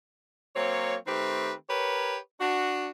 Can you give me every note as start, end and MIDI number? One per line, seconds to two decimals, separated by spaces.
0.55 0.95 54
0.55 0.95 58
0.55 0.95 60
0.55 0.95 73
1.06 1.52 51
1.06 1.52 57
1.06 1.52 60
1.06 1.52 67
1.06 1.52 71
1.69 2.16 67
1.69 2.16 70
1.69 2.16 71
1.69 2.16 73
2.40 2.88 62
2.40 2.88 66